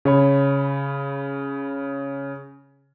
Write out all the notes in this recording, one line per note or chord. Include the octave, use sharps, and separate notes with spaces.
C#3 C#5 B5